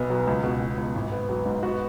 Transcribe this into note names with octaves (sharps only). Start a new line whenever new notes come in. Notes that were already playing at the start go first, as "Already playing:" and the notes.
Already playing: B1 B2 B3
F#3
C#2
B2
B2
C#2
G#1
B3
F#3
G#2
B3 F#4